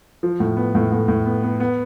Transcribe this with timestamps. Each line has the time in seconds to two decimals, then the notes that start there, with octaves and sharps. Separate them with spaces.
0.23 F3
0.40 A2
0.57 B3
0.75 A2
0.92 A2
1.08 A2
1.26 B3
1.43 B3
1.60 B3